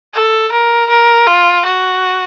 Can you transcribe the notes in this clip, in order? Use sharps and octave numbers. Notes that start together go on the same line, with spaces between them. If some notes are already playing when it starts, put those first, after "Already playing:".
A4
A#4
A#4
F4
F#4